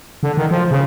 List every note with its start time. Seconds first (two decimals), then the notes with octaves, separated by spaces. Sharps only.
0.23 D3
0.37 D#3
0.51 F3
0.71 C#3